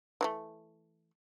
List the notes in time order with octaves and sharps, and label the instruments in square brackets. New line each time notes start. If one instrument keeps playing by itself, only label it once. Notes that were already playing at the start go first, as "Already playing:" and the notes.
[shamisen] E3 G3 A3